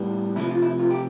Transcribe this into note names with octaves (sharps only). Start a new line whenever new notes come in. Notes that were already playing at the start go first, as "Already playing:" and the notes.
Already playing: A2 G3 B3
C3 F3 A3 E4
F4
E4
F4
G4